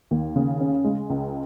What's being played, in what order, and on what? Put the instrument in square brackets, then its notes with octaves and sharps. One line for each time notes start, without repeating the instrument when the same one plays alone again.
[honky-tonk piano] D#2
C#3
C#4
G#3
C#2